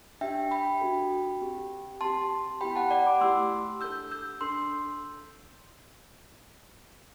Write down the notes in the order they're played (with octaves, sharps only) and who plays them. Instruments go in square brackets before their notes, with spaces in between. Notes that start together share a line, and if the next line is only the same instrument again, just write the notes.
[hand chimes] D4 G4 E5 G5
G5 B5
D4 F#4 A4
C4 G4
C4 G4 A5 C6
B3 E4 G4 G5 B5
F#5 A5
D5 F#5
B5 D6
A3 E4 G4 C6 E6
D4 A4 E6 G6
E6 G6
D4 A4 C6 E6